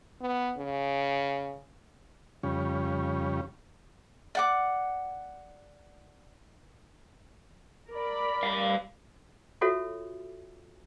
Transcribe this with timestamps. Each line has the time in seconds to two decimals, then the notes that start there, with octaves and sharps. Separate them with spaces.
0.21 B3
0.58 C#3
2.43 F2 C#3 G3 C#4
4.35 D5 F#5 D6
7.93 A#4 D5 B5
8.43 G3 F5
9.61 F4 F#4 A4 C#5 E5